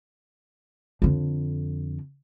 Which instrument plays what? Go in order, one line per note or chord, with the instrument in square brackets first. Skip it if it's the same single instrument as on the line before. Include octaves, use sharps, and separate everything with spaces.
[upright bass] F2 D3